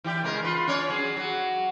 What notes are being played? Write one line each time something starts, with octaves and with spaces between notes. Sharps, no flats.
E3 G4 D5
C#3 G#3 A#4
F4 B4
C#4 C#5 D5
F#3 G#4
F#3 F#4